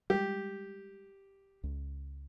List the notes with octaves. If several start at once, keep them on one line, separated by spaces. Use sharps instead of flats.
G3 G#3 G4
C#2